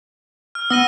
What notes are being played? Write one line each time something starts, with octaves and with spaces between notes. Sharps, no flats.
F6
B3 E6 A#6 D#7